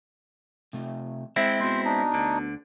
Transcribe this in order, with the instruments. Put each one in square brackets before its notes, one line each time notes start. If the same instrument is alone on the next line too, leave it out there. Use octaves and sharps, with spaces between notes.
[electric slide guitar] C3 A3
[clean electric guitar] G#3 C4 E4 [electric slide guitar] E5
[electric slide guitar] B3 F#4 [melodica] C5 C6
[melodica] D4 D#4
[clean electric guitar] D2 D3